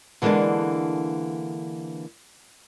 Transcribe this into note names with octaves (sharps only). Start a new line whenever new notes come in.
D3 E3 G#3 A#3 B3 D4